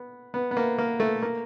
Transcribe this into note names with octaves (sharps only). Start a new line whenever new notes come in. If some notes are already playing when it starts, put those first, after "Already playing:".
Already playing: B3
B3
B3
A#3
A#3
A3
A#3